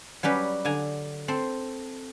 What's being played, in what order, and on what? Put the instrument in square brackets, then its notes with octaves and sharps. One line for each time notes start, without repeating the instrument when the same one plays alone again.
[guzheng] F#3 G3 C#4 G4 B4
D3 G#5 A#5
C4 A4 C6